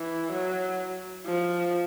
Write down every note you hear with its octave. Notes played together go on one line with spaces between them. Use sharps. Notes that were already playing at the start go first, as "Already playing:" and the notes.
Already playing: E3
F#3
F3